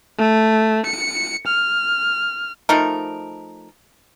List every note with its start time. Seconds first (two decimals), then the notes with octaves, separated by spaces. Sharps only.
0.19 A3
0.86 C#7
1.47 F6
2.69 F3 A3 D#4 A#4